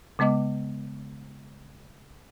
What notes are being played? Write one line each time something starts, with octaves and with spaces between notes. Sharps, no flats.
C#3 G#3 B3 D#5 D6